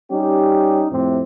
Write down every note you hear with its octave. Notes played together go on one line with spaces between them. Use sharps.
G3 C#4 D#4 G4
F2 A2 C3